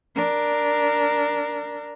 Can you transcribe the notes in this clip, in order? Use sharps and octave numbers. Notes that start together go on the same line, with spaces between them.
D4 A#4